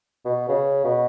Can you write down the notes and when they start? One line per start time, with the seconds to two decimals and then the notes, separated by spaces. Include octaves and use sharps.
0.25 B2
0.49 C#3
0.84 B2